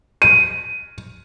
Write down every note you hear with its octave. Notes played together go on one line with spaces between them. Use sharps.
D#7